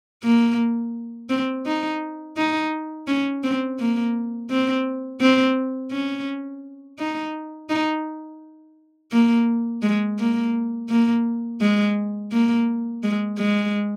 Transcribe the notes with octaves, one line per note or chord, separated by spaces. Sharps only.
A#3
C4
D#4
D#4
C#4
C4
A#3
C4
C4
C#4
D#4
D#4
A#3
G#3
A#3
A#3
G#3
A#3
G#3
G#3